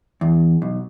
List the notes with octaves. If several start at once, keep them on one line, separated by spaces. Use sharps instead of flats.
E2
B1